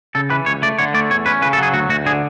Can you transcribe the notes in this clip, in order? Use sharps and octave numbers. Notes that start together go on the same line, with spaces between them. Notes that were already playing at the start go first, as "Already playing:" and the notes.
C#3 A4
E3 B4
C#2 C#5
A3 D5
D3 C#5
A3 D5
E2 C#5
C#4 B4
C#3 B4
A4
F#3 G#4
D2 F#4
D2 F#4
D3 G#4